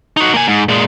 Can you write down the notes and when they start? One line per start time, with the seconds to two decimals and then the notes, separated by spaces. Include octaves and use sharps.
0.17 D#4 F#4
0.34 A#3 G#5
0.48 G#2
0.68 A#2 G#3